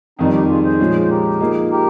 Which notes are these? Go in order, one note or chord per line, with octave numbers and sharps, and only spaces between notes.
F2 D#3 G3 C4 D#4
D#4 G4
F4 G#4
G#4 C5
A#2 F3 G#3 C#4
C5
G4 A#4
F3 A#3 D#4 G#4
G4 A#4